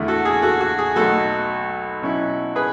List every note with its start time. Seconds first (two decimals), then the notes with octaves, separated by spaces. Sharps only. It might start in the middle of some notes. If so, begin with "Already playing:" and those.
Already playing: E2 D3 A3 E4
0.08 F#4 A4
0.25 G#4
0.42 F#4 A4
0.61 F#4
0.78 G#4
0.96 B1 B2 F#3 A3 F#4 A4
2.02 B2 F#3 C#4 E4
2.56 G#4 B4